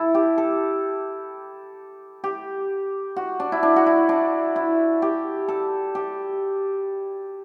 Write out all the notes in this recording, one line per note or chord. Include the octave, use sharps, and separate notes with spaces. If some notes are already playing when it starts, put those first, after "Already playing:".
Already playing: E4 A4
G4
A4
G4
F#4
D4
E4
D4
F#4
E4
D4
E4
G4
A4
G4